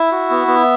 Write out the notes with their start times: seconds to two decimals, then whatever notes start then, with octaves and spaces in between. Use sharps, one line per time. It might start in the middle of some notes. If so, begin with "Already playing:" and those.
Already playing: E4 E5
0.12 F#4
0.30 B3
0.48 B3